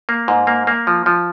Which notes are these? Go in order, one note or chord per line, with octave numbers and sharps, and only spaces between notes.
A#3
G#2
A#3
A#3
F3
F3